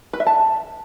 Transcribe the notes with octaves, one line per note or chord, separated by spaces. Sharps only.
B4
E5
A5